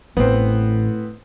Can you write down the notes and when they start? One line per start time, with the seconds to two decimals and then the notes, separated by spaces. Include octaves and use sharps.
0.17 A1 A2 B3 C4